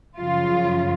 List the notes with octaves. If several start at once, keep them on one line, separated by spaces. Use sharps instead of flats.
F#2 C#3 F3 F4